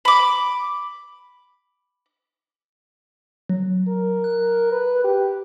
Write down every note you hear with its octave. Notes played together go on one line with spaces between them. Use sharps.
B5 D6
F#3
A#4
F#6
B4
G4